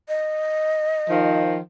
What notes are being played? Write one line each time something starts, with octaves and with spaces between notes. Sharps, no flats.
D#5
D#3 F3